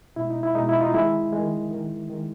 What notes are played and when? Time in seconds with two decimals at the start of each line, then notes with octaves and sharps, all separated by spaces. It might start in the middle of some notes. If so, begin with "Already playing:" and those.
0.16 B2 G#3 E4
0.30 D#4
0.43 E4
0.55 B2 G#3 D#4
0.69 E4
0.81 D#4 F4
0.94 D#3 G#3 E4
1.32 D#3 G#3
1.71 D#3 G#3
2.09 D#3 G#3